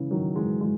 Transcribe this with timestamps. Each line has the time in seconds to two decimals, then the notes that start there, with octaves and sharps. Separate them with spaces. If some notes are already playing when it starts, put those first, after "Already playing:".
Already playing: C#3 E3
0.11 D#3 F#3
0.35 E3 G#3
0.61 E3 G#3